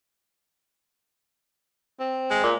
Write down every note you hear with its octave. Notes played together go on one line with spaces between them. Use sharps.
C4
G#3
A#2